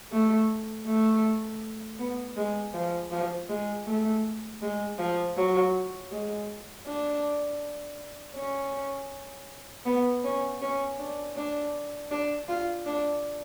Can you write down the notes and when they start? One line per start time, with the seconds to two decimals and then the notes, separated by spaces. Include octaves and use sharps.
0.12 A3
0.86 A3
1.99 B3
2.37 G#3
2.74 F3
3.12 F3
3.49 G#3
3.86 A3
4.61 G#3
4.99 F3
5.36 F#3
6.11 G#3
6.86 D4
8.36 C#4
9.86 B3
10.24 C#4
10.61 C#4
10.99 D4
11.36 D4
12.11 D4
12.49 F4
12.86 D4